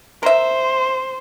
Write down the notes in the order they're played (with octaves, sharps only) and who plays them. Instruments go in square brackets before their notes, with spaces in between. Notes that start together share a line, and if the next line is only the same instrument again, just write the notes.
[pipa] A#4 E5 [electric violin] C5